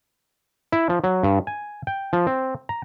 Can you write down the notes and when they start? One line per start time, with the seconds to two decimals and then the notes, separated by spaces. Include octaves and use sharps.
0.72 E4
0.89 F3
1.04 F#3
1.23 G2
1.47 G#5
1.87 G5
2.13 F3
2.27 C4
2.69 A#5